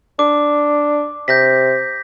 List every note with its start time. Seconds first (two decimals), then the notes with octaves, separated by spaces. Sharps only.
0.19 D4 D6
1.28 C3 G6 A#6 B6